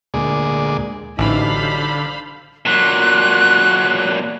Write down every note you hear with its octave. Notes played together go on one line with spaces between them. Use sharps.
D2 A#2 G#3 G#4 D5
A1 D3 F#3 G3 D#4 C5 F5 B5
A#2 F#3 F#6